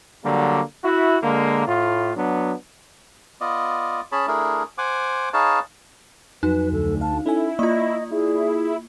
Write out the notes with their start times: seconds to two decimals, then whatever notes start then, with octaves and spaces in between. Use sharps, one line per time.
0.25 D3 F#3 G3 A#3
0.84 E4 F#4
1.23 D3 G#3 A#3
1.67 A2 F4
2.17 F#3 B3 D4
3.41 B3 F4 D5 D#5
4.12 C#4 G#4 C#5 A5 B5
4.27 A3 D4 E4 G#4 A#4
4.78 C5 F#5 G#5 D6
5.33 D#4 G#4 B4 C#5 F5 A5
6.43 F2 F#3 D#4 F#4 B4
6.72 D2 A4
7.01 F5 A5
7.26 C#4 D#4 E4 A4 G#5
7.59 A#3 F4 D5 D#5 D#6
8.11 E4 G#4